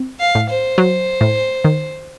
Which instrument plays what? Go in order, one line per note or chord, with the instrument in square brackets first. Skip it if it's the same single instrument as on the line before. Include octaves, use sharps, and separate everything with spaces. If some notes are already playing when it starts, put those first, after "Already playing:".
Already playing: [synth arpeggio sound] C4
[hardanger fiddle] F5
[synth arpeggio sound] A2
[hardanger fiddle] C5
[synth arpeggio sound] F#3
A2
D#3